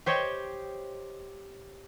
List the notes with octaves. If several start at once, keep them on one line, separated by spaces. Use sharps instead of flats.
G4 C5 C#5 D#5 G5